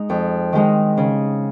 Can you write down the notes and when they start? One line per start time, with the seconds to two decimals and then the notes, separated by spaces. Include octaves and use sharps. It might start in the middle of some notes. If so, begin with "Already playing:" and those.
Already playing: G#3 D#4
0.10 F2
0.53 D#3 G#3 D#4
0.97 C#3